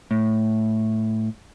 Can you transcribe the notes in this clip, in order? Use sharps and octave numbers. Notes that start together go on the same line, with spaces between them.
A2